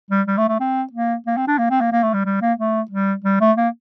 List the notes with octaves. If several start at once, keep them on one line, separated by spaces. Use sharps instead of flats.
G3
G3
A3
A3
C4
A#3
A#3
C4
D4
A#3
C4
A#3
A#3
A3
G3
G3
A#3
A3
G3
G3
A3
A#3